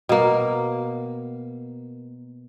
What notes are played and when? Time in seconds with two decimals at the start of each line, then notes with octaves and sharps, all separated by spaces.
0.09 B2 A#3